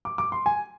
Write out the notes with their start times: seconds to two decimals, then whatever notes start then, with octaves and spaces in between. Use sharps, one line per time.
0.05 D6
0.18 D6
0.32 C6
0.46 G#5